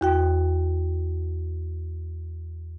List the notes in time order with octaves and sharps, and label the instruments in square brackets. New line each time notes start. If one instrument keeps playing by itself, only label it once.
[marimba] E2 F#4 G5